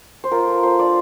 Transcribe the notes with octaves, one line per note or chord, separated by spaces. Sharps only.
C5
F4 A#4
A3
A3 C5
D4 D5